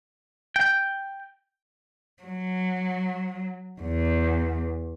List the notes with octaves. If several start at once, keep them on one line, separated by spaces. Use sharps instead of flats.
G5
F#3
E2